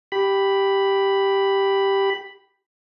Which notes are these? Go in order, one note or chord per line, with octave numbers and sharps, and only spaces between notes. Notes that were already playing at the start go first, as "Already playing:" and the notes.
G4 B5